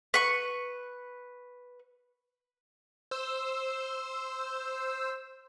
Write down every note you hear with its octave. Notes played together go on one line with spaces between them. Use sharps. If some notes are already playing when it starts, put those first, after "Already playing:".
B4 C#6
C5 E6